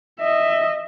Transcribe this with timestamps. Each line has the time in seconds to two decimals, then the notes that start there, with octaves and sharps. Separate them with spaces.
0.20 D#5 E5